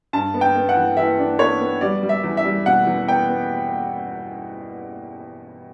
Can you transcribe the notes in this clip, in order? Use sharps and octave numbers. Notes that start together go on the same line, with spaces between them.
G2 A5
B3
G5
B3
F#5
E3
E3 E5
D4
B3 C#5
B3
G3 D5
G3
E5
E2
E5
G3
B2 F#5
E2
B3 G5
B3